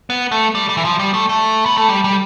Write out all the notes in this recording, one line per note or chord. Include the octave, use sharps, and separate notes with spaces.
B3
A3
G3
G3
E3
F3
G3
A3
A3
B3
A3
G3
G3